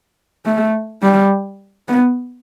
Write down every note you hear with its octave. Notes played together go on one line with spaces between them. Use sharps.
A3
G3
B3